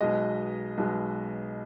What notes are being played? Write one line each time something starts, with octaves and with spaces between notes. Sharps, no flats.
B1 B2 G#3 D#5
B1 B2 G#3